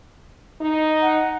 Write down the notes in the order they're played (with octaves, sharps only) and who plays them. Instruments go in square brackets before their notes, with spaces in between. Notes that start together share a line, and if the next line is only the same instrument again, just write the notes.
[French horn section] D#4
[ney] F#5